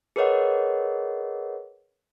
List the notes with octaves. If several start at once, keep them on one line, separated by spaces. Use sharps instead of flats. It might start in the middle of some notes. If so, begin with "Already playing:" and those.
G#4 A#4 B4 C#5 D#5 F#5